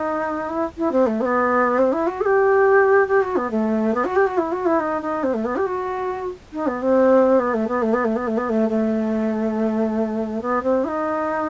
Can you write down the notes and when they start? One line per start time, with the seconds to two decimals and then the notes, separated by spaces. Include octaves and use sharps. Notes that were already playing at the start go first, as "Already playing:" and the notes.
Already playing: D#4
0.49 E4
0.77 E4
0.91 C4
1.06 A3
1.20 C4
1.25 B3
1.78 C4
1.92 E4
2.07 F#4
2.20 A4
2.25 G4
3.07 G4
3.22 F#4
3.36 B3
3.50 A3
3.94 B3
4.04 F#4
4.15 G4
4.26 F#4
4.37 E4
4.52 F#4
4.65 E4
4.79 D#4
5.01 D#4
5.23 C4
5.33 A3
5.45 B3
5.56 G4
5.66 F#4
6.53 D#4
6.66 B3
6.82 C4
7.39 B3
7.53 A3
7.68 B3
7.82 A3
7.93 B3
8.04 A3
8.16 B3
8.27 A3
8.37 B3
8.49 A3
8.69 A3
10.41 B3
10.62 C4
10.84 E4
10.88 D#4